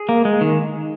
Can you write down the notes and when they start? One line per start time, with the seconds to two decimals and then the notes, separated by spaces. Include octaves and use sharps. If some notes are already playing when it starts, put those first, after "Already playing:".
Already playing: G#4
0.09 A#3
0.25 G#3
0.41 D#3